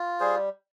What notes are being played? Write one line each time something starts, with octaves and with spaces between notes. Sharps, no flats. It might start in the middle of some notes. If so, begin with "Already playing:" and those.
Already playing: F4
G3 G#4 C5